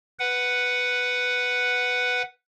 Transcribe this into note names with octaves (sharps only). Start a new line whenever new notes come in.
B4 F#5